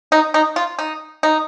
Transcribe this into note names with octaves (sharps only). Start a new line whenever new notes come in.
D#4
D#4
F4
D#4
D#4